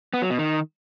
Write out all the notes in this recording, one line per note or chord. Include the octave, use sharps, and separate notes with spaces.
B3
F#3
B2
D#3